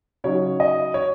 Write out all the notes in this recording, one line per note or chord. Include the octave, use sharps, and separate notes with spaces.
C#3 F#3 D#4 C#5
D#5
C#5